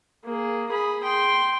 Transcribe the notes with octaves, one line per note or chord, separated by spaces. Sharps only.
A#3 G#4
G#4 B5
G5 C6